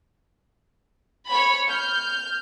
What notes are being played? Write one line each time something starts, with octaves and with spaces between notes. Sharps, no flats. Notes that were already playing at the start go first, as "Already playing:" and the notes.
C#5 B5
F6 G6